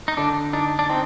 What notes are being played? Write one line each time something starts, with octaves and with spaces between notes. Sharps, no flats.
D#4
D3 D4
D4 D#4
D4
C4 D#4